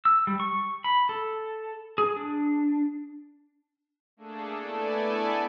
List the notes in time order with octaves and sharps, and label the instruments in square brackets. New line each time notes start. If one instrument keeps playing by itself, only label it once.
[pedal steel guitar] E6
G3
C#6
B5
A4
G#4
D4
[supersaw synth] A3 A#3 D4 G#4 A4
A3 B3 E4 A4 D5 G#5